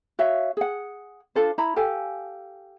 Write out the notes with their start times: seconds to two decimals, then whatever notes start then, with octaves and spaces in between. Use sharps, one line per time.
0.19 F#4 C#5 E5 F5
0.57 G#4 F#5
1.35 D4 F4 A4 C5
1.58 E4 A#5 B5
1.76 G4 A4 F5 G#5